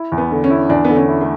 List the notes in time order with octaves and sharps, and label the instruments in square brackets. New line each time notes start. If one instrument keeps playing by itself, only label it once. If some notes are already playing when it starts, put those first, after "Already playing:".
Already playing: [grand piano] E4
E2
[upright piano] B3
[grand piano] D3
[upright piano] C#4
[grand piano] E4
[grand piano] E2 [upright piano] D4
[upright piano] B3
[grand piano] D3
[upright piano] C#4
[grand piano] E4
[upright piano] A3